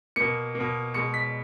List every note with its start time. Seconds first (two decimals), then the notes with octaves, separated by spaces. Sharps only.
0.16 B2 A#3 C#7
0.55 A#3
0.60 B2
0.94 B2 G#3 C#7
1.14 B6